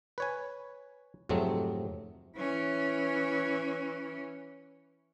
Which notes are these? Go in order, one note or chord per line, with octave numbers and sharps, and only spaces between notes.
B4 C#5 G#5
F2 G#2 C3 F#3 A3 C4
E3 C#4